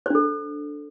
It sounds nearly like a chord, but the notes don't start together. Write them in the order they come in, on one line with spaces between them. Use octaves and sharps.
C5 D4 A4